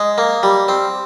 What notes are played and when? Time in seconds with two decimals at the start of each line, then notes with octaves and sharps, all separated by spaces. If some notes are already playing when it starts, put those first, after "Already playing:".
Already playing: G#3
0.18 A#3
0.43 G3
0.68 C4